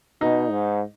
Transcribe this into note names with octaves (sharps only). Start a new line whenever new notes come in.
B2 D#4
G#2